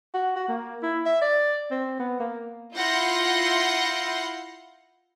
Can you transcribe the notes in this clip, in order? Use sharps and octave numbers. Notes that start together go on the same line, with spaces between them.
F#4
F#4
A#3
E4
E5
D5
C4
B3
A#3
E4 F4 F#5 G6 A#6 C7